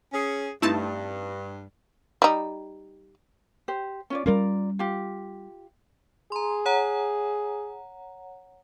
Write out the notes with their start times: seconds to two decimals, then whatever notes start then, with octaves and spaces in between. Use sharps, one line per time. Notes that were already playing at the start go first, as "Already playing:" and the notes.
0.13 C#4 G#4
0.62 G2 A3 C4 D#4 E4 A5
2.22 G3 D#4
3.68 G4 C5
4.10 C#4 F4 D5
4.26 G3 C#4 F4 A#4 D5
4.79 F4 G4
6.32 G#4 A#5 C6
6.66 C#5 F#5 A#5